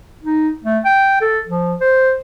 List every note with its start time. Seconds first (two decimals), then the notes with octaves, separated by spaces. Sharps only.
0.23 D#4
0.65 A3
0.85 G5
1.21 A4
1.47 F3
1.81 C5